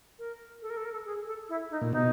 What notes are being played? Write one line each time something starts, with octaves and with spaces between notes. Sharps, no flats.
A#4
A4
A#4
A4
A#4
A4
G#4
A4
E4
D#4
A#2
B2 D#4